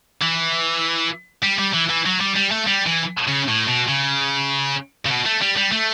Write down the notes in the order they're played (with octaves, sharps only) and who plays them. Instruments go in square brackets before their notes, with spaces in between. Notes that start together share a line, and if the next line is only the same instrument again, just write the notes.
[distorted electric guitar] E3
G3
G3
E3
E3
F#3
G3
G3
A3
G3
E3
C#3
A2
B2
C#3
C#3
B2
A3
G3
G3
A3